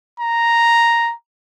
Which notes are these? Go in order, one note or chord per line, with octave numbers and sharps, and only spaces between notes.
A#5